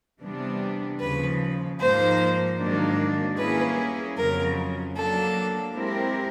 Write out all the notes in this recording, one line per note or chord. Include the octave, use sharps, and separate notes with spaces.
C3 E3 G3 B3 D4
D#2 C#3 F3 B4
G#2 F3 A#3 D#4 C5
G#2 D#3 F#3 A#3 D4
G3 A#3 C#4 E4 G#4 B4
F2 C#3 F#3 A#4
F#3 A#3 D4 A4
G#3 C4 E4 G4 A#4